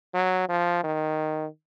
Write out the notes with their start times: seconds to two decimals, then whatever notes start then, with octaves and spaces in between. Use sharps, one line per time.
0.14 F#3
0.49 F3
0.84 D#3